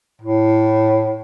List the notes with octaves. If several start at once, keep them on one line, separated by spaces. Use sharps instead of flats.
A2